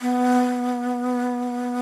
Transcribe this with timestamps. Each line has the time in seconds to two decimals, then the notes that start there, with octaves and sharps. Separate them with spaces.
0.01 B3